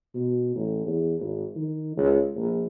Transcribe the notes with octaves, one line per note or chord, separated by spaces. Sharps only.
B2
A1
E2
G#1
D#3
C#2
A#1